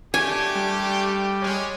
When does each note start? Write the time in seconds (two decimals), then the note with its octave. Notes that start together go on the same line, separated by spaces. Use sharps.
0.14 A3 D4 G4 G#5
0.55 G3
1.41 G#3 C#4